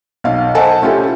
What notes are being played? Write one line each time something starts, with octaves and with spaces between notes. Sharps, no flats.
B1 F5
A4 C5 D#5 F#5 G#5 A5
A3 C#4 E4 F4 G4 A4